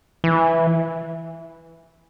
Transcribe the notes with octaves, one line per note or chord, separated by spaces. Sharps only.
E3